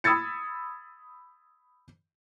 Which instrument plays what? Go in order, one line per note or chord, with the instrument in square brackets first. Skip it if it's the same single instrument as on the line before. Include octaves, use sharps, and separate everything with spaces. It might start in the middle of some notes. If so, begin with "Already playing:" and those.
[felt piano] B5 D#6 E6 G#6 A6 C#7